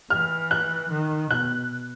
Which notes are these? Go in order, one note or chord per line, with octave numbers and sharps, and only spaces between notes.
E3 F6
F#6
D#3
B2 F#6